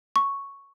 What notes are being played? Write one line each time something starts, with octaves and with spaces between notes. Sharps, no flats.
C#6